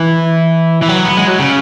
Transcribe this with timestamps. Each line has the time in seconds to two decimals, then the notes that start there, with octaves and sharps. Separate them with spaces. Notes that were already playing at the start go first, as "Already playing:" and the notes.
Already playing: E3
0.82 E3
0.89 F#3
1.05 B3
1.17 G#3
1.28 F#3
1.39 C#3